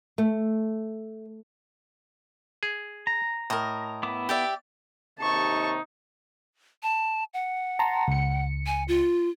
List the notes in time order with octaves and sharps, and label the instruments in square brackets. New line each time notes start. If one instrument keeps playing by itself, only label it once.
[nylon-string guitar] A3
[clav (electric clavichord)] G#4
[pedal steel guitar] A#5
[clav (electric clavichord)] A2 [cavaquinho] A#4 D#5
[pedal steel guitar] B3 E4 D6
[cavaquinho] G4 D5 E5
[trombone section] D#2 C3 D#4 [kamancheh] A5 C#6
[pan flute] A5
F#5
[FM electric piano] A5 A#5 C6
C#2 C#7
[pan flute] G#5
F4